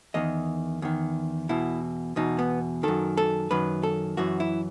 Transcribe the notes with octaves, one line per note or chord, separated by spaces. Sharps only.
E2 D#3 D#5
E2 D#3
E2 B2 E4
E2 B2 D#4
B3
F#2 D#3 A4
A4
F#2 D#3 B4
A4
F#2 E3 F#4
E4